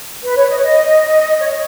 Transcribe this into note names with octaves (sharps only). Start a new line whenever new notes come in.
B4
C#5
D#5
C#5
D#5
C#5